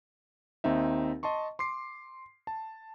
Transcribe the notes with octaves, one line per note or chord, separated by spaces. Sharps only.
D#2 C4 D#4 E5
D#5 A5 C6 C#6
C6 D6 C7
A5